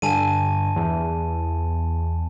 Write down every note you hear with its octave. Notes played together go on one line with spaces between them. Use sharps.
G2 D3 G#5 A5 D#7
E2